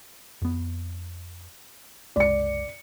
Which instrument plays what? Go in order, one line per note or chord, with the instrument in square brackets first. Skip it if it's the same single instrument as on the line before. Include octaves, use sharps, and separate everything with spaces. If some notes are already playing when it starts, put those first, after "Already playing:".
[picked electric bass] F2 B3
[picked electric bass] F#1 C2 G#3 [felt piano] D5 C#7